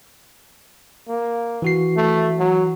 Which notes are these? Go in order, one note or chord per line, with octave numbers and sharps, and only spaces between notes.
A#3
E3 F#4 C7
A3
F#3